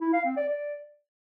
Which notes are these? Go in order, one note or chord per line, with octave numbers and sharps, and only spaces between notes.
E4
F5
C4
D5
D5